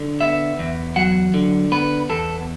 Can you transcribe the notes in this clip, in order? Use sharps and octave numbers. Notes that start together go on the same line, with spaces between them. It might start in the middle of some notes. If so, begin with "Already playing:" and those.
Already playing: D3
B3 E5
E2
F#3 F#5
D3
B3 B4
E2 A4